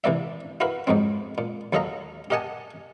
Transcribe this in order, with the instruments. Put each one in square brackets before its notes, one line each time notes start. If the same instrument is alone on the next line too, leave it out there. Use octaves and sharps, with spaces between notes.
[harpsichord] C3 E3 A#3 D5 E5
E4 F#4 A#4 B4 F5
F2 G#2 F#3 C4
A#2
D#2 F#3 A4 D#5 F5 A#5
G4 A#4 D#5 F#5 G#5 A5